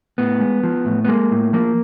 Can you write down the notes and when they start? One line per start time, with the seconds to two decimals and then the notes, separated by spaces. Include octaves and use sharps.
0.18 A2 B3
0.40 G#3
0.63 F3
0.86 A2
1.05 B3
1.08 G#3 A#3
1.32 A2
1.53 F3 A#3